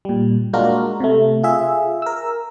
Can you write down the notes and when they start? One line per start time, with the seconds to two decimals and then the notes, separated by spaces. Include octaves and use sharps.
0.05 A#2 G3
0.53 G#3 A#3 D4 F4 F#4 A#4
1.00 C3 A3
1.43 F4 G#4 E5
2.02 A#4 E6